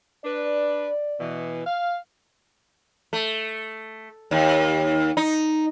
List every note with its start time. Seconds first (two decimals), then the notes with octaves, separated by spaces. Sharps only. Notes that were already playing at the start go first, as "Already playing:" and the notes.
0.25 D4 B4 D5
1.20 B2 E3
1.66 F5
3.13 A3
4.31 D#2
5.17 D#4